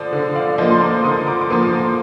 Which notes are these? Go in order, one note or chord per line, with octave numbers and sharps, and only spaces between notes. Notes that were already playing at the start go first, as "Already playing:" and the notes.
Already playing: D3 F3 C5 D5
D3
D5 F5
F3 A#3 C5 D#5
C6
A#5 D6
D3 C6 D#6
A#5 D6
D6
F3 A#3 C6 D#6
A#5 D6